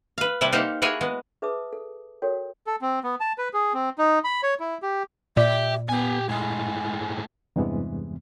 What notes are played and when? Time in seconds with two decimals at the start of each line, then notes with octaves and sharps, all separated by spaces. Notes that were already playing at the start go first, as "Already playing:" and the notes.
0.18 B4 F5
0.41 C3 G3 E4 B4 A5
0.52 A#3 D#4 G4 C5 F5 F#5
0.82 A#3 E4 F#4 G#4 C#5 G#5
1.01 G#3 B3
1.42 G#4 B4 E5 A5 D6 D#6
1.73 A4
2.22 F#4 A4 A#4 C#5 G5
2.67 A4
2.82 C4
3.04 B3
3.20 A5
3.38 B4
3.53 G#4
3.74 C4
3.98 D#4
4.24 B5
4.43 C#5
4.60 E4
4.82 G4
5.37 A#2 G4 D5 E5
5.89 B3 G4 G#5
6.29 A2 G#3 G#5
7.56 E2 G2 C3 E3 G#3 B3